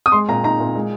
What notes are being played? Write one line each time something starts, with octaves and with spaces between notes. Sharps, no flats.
D#6
G#3 C6
A#2 A#5
D#4 A#5
A#2
G#3